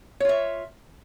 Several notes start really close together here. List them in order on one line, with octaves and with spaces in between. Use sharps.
C#5 F4 E5